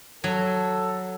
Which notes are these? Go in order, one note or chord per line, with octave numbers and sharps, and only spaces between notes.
F#3 A4